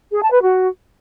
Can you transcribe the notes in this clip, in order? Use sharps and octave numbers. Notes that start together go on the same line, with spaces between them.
G#4
A5
B4
F#4